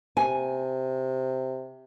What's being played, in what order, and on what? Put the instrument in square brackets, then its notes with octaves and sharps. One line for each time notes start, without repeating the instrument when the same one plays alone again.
[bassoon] C3 [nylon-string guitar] G#5